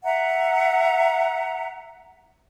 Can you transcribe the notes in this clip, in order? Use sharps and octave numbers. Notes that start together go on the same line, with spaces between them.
E5 F#5 A#5